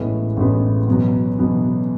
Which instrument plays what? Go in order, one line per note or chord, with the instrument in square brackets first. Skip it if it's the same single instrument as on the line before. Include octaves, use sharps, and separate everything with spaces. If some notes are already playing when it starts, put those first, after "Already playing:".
Already playing: [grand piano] A1 A2 E3 G#3 B3
A1 A2 E3 G#3 B3
E2 B2 F#3 B3
E2 B2 F#3 B3